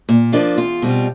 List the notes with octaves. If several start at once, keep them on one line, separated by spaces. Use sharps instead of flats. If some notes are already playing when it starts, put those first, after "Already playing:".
A#2
F3 A#3 D4 F4
E2 F4
B2 G3 C4 F4